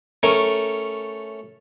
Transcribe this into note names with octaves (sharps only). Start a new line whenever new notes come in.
A3 C#4 A#4